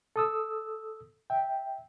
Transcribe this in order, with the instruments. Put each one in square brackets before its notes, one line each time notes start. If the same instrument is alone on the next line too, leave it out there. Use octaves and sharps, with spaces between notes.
[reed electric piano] A4 D#6 E6
E5 G5